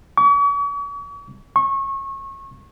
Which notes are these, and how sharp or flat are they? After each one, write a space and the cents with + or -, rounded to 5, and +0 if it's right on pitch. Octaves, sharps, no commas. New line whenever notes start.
C#6 +45
C#6 -25